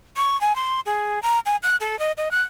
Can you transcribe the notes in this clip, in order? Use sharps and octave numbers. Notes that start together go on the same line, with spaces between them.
C#6
G#5
C6
G#4
A#5
G#5
F#6
A4
D#5
D#5
F#6